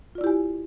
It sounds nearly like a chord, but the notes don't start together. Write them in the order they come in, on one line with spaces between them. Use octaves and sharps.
F4 D5 E4 G4 G#5